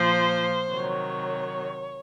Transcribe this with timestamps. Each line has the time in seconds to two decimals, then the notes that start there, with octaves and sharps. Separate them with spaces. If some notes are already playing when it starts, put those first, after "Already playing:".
Already playing: A#2 F3 C5
0.70 C3 D#3 F#3 C#5